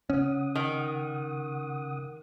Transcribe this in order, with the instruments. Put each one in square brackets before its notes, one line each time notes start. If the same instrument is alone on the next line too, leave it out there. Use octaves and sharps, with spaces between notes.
[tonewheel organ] C#3 F#5 D#6 [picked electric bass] C#4
[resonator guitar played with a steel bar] D#3